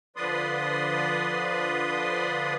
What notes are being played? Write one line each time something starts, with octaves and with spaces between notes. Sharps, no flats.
D3 F3 B4 D5 C6 D#6